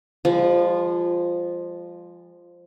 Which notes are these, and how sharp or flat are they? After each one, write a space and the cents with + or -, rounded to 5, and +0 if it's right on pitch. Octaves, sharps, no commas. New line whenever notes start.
F3 +0 G#3 -40